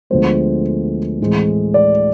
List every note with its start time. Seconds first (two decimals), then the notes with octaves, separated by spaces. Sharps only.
0.10 D2 D3 F3 G#3 B3 C5
1.20 A2 E3 G#3 C4
1.74 D5